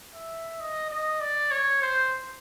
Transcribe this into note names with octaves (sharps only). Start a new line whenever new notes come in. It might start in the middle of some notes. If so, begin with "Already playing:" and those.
E5
D#5
D#5
D5
C#5
C5